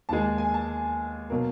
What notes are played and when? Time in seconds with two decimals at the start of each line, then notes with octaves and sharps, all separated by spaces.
0.09 D#2 D#3 G#3 A5
0.23 A5
0.38 G#5
0.54 A5
1.30 B2 F#3 A#3